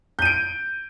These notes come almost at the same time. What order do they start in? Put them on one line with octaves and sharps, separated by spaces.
G6 D#7 D7